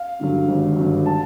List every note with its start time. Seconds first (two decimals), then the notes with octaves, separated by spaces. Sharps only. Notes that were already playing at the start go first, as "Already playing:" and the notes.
Already playing: F5
0.19 G2 D3 F#3
0.48 G#1
0.76 G2 D3 F#3
1.06 A5